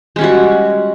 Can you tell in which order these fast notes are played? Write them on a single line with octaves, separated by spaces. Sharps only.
G#3 C#4 G3 F#4